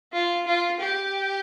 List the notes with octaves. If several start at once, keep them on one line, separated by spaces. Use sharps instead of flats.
F4
F4
G4